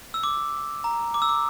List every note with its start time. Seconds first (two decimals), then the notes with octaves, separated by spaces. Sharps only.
0.14 E6
0.23 D6
0.84 A#5
1.14 D6
1.22 E6
1.29 D6